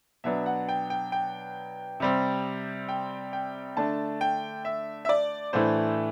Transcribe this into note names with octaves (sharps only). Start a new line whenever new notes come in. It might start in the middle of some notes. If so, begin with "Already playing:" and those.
B2 F#3 B3 D4 E5
F#5
G5
G5
G5
C3 G3 C4
G5
G5
D3 A3 D4 A5
G5
E5
E5
D5
A2 E3 A3 D4 C5